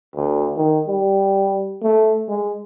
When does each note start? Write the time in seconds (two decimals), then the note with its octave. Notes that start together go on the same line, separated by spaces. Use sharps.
0.15 D2
0.57 D#3
0.87 G3
1.83 A3
2.28 G#3